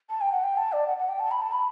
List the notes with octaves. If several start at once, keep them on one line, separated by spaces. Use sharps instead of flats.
A5
G5
F#5
G5
A5
D5
F#5
F#5
G5
A5
B5
A5
B5